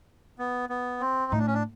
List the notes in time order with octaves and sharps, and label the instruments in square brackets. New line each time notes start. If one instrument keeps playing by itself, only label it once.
[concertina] B3
B3
C4
[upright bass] A2 [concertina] D#4
[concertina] D4
C#4
D4